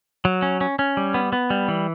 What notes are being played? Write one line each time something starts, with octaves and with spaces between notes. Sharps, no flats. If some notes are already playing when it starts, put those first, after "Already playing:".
F#3
C#4
C#4
C#4
G3
B3
B3
G3
E3